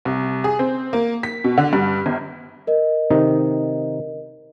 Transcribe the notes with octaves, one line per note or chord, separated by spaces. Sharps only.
C2
G#4
C4
A#3
B6
B2
D3
G2
G1
A#4 D#5
C3 D#3 D#4